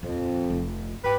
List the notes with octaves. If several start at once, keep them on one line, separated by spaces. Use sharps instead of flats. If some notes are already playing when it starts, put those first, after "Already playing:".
D#1 F2
F1 F4
G#2 G4 B4